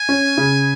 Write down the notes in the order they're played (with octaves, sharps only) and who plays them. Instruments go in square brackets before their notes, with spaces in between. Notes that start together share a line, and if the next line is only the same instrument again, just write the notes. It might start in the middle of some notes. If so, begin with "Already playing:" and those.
Already playing: [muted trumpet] G#5
[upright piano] C#4
C#3